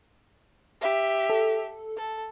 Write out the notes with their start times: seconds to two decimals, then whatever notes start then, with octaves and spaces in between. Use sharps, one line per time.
0.81 G4 E5
1.30 A4
1.97 A4